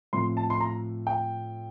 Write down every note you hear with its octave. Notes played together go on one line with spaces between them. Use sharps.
A2 F3 C4 C6
A5
C6
A#5
G5